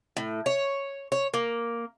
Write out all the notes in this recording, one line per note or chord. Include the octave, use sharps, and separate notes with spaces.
A2
C#5
C#5
A#3